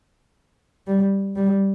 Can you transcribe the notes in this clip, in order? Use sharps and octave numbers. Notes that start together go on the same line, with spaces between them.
G3
G3